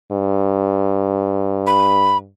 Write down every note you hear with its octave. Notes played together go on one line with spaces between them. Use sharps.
G2
B5